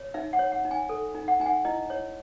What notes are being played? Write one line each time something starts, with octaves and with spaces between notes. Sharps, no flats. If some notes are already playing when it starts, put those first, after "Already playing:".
Already playing: C#5
D#4 E5
F#5
C#5
F#5
D#4
G#5
A4
D#4
F#5
D#4 G#5
F#5
E4 D#5
C#5